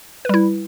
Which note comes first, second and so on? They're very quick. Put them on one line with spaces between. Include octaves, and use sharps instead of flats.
B4 G3 E4